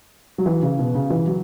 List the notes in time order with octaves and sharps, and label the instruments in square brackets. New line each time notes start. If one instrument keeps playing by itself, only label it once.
[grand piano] F#3
E3
C#3
B2
C#3
E3
F#3